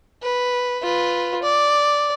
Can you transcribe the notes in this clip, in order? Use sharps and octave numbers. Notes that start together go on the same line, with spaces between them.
B4
F4 B4
D5